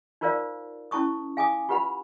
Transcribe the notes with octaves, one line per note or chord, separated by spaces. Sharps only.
D#4 F4 A#4 C5 D5 F5
C#4 E4 A5 C#6 D#6
F5 G#5 D6 D#6
F4 G4 B4 F#5 B5